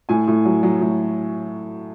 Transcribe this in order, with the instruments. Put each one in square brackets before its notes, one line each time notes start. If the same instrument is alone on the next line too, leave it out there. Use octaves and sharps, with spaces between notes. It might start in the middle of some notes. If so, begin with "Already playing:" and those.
[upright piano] A2 G#5
A2
F#3
F#3
A2